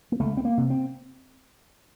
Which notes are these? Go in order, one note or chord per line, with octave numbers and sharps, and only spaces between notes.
A#3
C#2 A3
C4
A#3
C3
C4